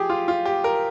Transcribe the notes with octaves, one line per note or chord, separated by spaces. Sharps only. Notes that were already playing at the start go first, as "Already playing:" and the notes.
Already playing: F3 G4 G#4
F4
F4
G4
A#4